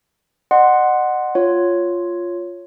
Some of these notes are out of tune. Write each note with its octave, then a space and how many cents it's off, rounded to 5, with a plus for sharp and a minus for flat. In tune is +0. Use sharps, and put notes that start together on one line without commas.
D#5 -40 F#5 +0 C6 +0
F4 +0 C#5 +0